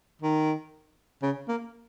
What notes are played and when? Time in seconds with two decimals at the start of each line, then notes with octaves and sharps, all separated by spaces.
0.22 D#3
1.23 C#3
1.48 A#3